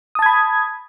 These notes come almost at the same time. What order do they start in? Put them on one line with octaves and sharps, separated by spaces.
D#6 A5 G#6 B5